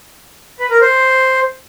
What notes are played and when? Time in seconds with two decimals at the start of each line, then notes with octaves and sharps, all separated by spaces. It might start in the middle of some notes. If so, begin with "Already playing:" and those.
0.59 B4
0.70 A#4
0.81 C5